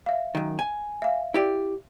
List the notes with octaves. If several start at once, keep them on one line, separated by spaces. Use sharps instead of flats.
E5 F5
F#2 D#3
G#5
E5 F5
E4 G4 D5